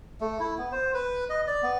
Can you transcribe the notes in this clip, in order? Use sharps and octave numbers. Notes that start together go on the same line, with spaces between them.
A3
E4
B3
C5
B4
D#5
D5
B3